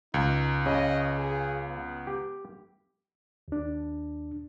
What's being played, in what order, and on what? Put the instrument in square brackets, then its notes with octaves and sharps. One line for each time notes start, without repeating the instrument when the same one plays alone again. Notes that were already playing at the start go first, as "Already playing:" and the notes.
[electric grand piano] C#2 [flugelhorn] D#4
[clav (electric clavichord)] C#3 [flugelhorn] D#5
[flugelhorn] G#4
B3
[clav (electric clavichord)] G4
[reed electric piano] D#2 D4